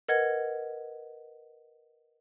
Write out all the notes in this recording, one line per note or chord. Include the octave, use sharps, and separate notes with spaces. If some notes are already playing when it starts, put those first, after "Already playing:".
A#4 B4 D#5 F#5 G#6